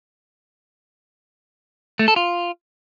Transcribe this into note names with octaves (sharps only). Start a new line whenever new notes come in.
A3
A4
F4